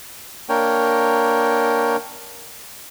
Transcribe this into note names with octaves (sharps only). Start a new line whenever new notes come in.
A#3 D4 A#4 C#5 G5